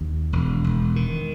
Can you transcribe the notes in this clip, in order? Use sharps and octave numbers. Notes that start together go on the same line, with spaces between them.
D#2
E1
E1
D#3